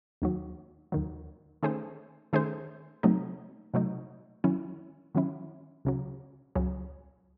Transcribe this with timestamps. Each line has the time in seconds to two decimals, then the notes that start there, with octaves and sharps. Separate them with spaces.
0.22 D#2 D#3 F#3
0.92 D#2 D#3 F#3
1.63 D#3 A3 C#4 G#4 C5
2.33 D#3 A3 C#4 G#4 C5
3.03 C3 F#3 A3 D#4
3.74 C3 F#3 A3 D#4
4.44 D#3 F#3 C#4 E4
5.15 D#3 F#3 C#4 E4
5.85 C#2 C#3 F#3
6.55 C#2 C#3 F#3